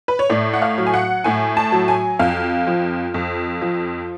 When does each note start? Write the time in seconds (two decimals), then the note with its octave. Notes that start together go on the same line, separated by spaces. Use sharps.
0.08 B4
0.19 C#5
0.30 A2 D5
0.53 F#5
0.62 F5
0.78 F#3
0.87 G#5
0.94 F#5
1.24 A2 G#5
1.57 A5
1.72 F#3
1.88 G#5
2.19 F2 F5
2.67 F3
3.14 F2
3.61 F3